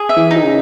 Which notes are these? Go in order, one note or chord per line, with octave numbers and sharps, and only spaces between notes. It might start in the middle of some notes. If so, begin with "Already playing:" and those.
Already playing: G#4
E5
E3
D#4
D#3
C#3